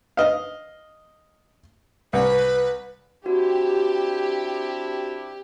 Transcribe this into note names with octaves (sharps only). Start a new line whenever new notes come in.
D#5 F5
C2 B4
C4 D4 E4 F#4 G4